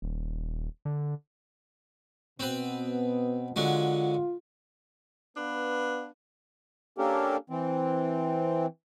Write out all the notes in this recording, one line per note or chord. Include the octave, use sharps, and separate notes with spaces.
D#1
D3
B2 B3 C4 B4
D3 F#3 G#3 F4
B3 D4 B4 F5
A#3 C#4 D4 G4 A4 A#4
E3 C4